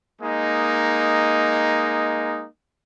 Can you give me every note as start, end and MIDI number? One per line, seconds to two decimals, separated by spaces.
0.22 2.46 56
0.22 2.46 58
0.22 2.46 63